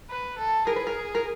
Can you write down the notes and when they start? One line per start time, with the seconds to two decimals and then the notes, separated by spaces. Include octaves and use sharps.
0.10 B4
0.38 A4
0.67 G#4 A#4
0.76 B4
0.87 A#4
1.15 A#4